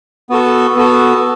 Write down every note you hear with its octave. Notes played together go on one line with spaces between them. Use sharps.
B3 F#4 A4
B3 F#4 A4